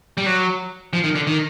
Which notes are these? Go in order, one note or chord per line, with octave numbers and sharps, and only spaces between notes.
G3
F#3
F3
D#3
D3
D#3